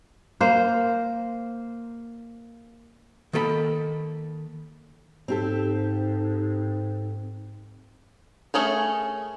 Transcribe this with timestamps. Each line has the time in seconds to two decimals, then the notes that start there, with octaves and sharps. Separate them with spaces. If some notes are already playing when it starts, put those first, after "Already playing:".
0.41 A#3 C5
3.33 D#3 A#3 A4 G5 B5
5.28 G#2 C4 G4 A4
8.54 A3 C#4 G#4 A#4